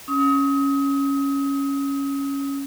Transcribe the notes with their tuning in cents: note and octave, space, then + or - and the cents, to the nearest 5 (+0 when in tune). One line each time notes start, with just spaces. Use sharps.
C#4 +0 D#6 +30